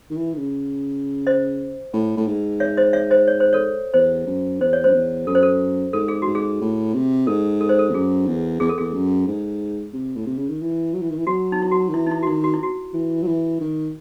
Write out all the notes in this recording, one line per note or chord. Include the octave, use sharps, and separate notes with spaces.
D#3
E3
D#3
C#3
C5 D#5
A2
A2
G#2
C#5 E5
C5 D#5
C#5 E5
C5 D#5
C#5
C5
A4 C#5
E2 C5
F#2
E2 C5
C#5
F#2 C5
E2
F#2 A4
C5
A4
G#2 A4
G#4
F#4
G#2
G#4
A2
C3
G#2 A4
A4
C5
A4
E2
F#2 G#4
E2
E2 G#4
A4
E2 G#4
F#2
G#2
C3
A2
C3
C#3
D#3
E3
F#3
E3
D#3
E3
F#3 F#4
D#4
E4
F#4
D#3
E3 E4
D#4
E4
F#4
D#3 E4
F#4
E4
F#4
E3
F#3
E3
D#3